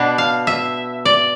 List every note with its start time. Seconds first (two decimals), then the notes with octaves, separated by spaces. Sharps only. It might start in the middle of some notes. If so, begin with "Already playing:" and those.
Already playing: B2 B3 D4
0.18 F5
0.47 E5
1.05 D5